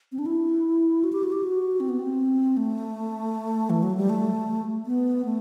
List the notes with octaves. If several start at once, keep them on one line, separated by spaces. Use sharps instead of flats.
C4
D4
E4
F#4
G4
F#4
G4
F#4
C4
B3
C4
A3
E3
F#3
G3
A3
B3
A3